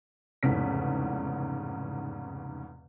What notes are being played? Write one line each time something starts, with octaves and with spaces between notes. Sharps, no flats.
F1 E2 G#2 C#3 B6